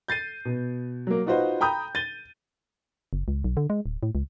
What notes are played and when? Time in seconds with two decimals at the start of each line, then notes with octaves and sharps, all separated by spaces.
0.08 G6 A6 C7 D#7
0.45 B2
1.07 F#3 A#3
1.26 D#4 F4 F#4 B4 C5 D#5
1.61 G5 A#5 B5 D#6 G6
1.95 A6 D#7 G7
3.13 F#1
3.28 C#2
3.44 B1
3.57 D3
3.70 G#3
3.86 D1
4.03 A2
4.15 C#2